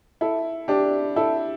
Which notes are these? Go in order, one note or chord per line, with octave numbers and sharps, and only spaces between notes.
E4 A4
D4 G4
E4 A4